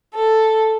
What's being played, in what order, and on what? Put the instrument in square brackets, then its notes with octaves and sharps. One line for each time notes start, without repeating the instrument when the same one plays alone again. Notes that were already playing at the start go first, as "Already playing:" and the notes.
[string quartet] A4